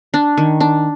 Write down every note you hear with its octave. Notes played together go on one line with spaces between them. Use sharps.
D4
D#3
D4